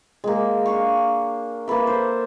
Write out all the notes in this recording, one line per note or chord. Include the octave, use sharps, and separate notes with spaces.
G#3 A#3
D4 F5 C#6
A#3 A4 B4 E5
C5